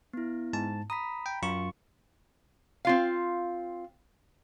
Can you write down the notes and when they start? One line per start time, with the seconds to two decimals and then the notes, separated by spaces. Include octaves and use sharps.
0.13 B3 E4
0.53 G#2 A5
0.90 A#5 B5 D#6 B6
1.26 G5
1.43 F#2 F4 C#6
2.85 C4 F4 F5